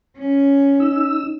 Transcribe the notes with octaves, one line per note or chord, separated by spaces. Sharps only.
C#4
D#4 E6